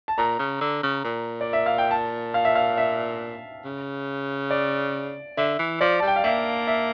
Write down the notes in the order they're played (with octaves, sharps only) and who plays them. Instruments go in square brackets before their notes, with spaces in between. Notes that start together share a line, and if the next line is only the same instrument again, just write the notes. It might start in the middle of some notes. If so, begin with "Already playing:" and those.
[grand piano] A5
[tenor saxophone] A#2 [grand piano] A#5
[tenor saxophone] C#3
D3
C#3
A#2
[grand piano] D5
E5
F5
G5
A5
F5
E5
F5
E5
[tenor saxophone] C#3
[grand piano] D5
[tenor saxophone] D3 [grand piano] E5
[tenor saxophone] E3
[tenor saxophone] F3 [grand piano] D5
[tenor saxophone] G3 [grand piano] A5
[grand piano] G5
F5
[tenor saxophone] A#3 [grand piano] E5
[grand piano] E5